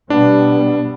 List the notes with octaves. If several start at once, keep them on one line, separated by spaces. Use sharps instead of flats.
B2 G3 B3 D4